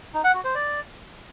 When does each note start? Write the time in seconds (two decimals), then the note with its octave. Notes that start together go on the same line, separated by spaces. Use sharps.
0.14 D#4
0.24 F#5
0.34 F#4
0.45 C5
0.55 D5